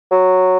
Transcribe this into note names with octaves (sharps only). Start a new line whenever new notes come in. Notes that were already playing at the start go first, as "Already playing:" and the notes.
F#3